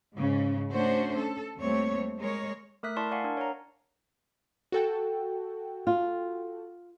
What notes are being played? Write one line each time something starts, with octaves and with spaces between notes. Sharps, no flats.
G#2 C#3
A3 C#4 D4 F#4 C5
A4
D#2 G3 A3 C4 C#5
G#3 A#4 C#5
A3 A#4 E5 D#6 F#6 B6
E4 A#4 D5 A5 C6 C#6
D5 F5 F#5 G#5 C#6
D4 A#4
C#5 F#5 A#5
F#4 A4 G5
F4